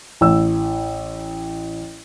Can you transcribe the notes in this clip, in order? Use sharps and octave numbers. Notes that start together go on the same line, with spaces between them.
A1 E6